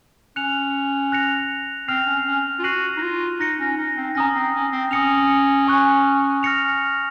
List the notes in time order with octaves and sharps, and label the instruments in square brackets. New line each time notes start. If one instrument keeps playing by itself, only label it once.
[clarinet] C#4 [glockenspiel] F#6 C#7 F7
[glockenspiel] F#6 A#6 C#7 F7
[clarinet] C4 [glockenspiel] F6 C7 F7
[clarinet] C#4
C#4
F4
[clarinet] F#4 [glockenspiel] F#6 C7 D#7 F#7
[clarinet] D#4
F4
[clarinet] D#4 [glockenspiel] F#6 A#6 C#7
[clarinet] C#4
D#4
C4
[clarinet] C#4 [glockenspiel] A#5 D#6 A#6
[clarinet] C4
C#4
C4
[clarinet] C#4 [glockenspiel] D#6 A#6 C#7 F7
[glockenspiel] G#5 C#6 F#6
F6 A#6 C#7 F7